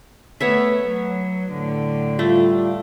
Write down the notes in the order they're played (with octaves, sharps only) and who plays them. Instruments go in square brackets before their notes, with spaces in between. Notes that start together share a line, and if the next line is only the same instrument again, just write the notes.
[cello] A3 [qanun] B3 C#5 E5
[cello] F#3
A2 D3
[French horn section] G3 F4 [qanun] A3